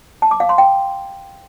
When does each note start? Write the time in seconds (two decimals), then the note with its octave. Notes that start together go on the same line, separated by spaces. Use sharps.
0.22 A5
0.31 D6
0.40 F5
0.49 C6
0.58 G5